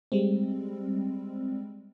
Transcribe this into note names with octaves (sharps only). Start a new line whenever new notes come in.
G3 G#3 C4